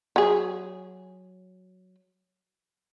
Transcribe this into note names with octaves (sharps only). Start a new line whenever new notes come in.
F#3 G#4